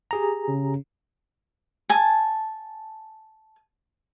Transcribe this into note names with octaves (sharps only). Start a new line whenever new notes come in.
G4 G#4 A#5
C#3
G#5 A5